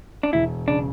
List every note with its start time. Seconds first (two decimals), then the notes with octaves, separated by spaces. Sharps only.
0.23 D4
0.33 E1 E4
0.68 C#3 D4